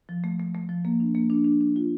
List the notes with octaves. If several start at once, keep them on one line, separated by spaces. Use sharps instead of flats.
F3
A3
A3
A3
F3
A#3
D4
A#3
D4
D4
D4
F4